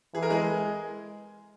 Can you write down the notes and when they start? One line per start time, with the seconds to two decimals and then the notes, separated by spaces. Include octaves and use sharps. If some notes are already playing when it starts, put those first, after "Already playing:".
0.14 E3 G#4
0.22 A#4
0.30 G#3 G#4